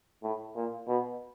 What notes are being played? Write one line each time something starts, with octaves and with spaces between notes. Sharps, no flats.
A2
A#2
B2